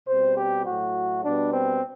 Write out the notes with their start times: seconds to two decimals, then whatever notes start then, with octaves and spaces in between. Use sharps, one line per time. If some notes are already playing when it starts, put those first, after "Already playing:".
0.08 B2 G3 C4 C5
0.37 G4
0.66 A2 F#3 A3 F#4
1.24 B2 G3 B3 D4
1.53 C4